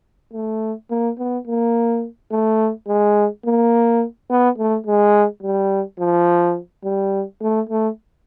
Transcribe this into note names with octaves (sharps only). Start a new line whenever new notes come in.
A3
A#3
B3
A#3
A3
G#3
A#3
B3
A3
G#3
G3
F3
G3
A3
A3